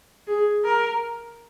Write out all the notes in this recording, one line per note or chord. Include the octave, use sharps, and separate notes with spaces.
G#4
A#4